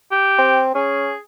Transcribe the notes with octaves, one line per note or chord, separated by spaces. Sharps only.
G4
C4
C#4 G#4